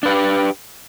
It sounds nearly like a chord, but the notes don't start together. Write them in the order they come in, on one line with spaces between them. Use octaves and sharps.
D4 B4 G4